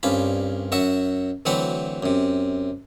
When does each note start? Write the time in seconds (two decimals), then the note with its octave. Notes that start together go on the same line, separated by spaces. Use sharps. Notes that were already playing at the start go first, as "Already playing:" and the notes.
0.03 C2 G2 C#4 F4 B5
0.72 F#2 F#4 E5 C#6
1.45 D2 E3 F#3 C4 F#5 B5
2.03 F#2 C3